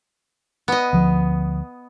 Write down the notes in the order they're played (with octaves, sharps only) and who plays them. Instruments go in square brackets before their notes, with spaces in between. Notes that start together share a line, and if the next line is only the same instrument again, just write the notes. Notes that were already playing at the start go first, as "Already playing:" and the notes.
[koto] B3 D#5
[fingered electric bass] D2 F3